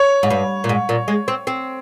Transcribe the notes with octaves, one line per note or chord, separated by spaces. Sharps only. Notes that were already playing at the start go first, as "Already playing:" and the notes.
Already playing: C#5
G#2
G2
A#2
G#2
A#2
G#3
C4
C4